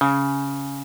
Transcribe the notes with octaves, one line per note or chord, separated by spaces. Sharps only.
C#3